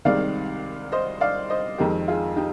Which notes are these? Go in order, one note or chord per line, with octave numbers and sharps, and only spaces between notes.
C2 C3 D#3 G#3 D5 F5
C5 D#5
D5 F5
C5 D#5
F2 D#3 G#3 G4 A#4
F4 G#4
D#4 G4